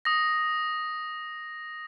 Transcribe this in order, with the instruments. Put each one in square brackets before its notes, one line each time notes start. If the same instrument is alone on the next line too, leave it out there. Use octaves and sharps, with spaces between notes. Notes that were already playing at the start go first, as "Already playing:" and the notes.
[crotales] D#6 A#6